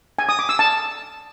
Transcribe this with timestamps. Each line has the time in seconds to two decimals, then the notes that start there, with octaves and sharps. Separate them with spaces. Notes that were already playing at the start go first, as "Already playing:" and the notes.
0.19 G#5
0.29 D#6
0.39 D6
0.49 E6
0.59 A5